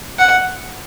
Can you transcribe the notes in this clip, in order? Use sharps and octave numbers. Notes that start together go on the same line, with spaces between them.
F#5